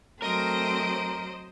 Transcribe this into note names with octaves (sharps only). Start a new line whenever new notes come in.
F#3 A3 C4 A#4 C5 D#5 D7